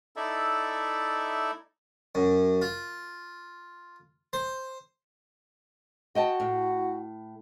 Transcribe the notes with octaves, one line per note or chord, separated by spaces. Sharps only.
D#4 E4 A4 D5 E5
F#2
F4
C5
F#4 D#5 G5 A5
A2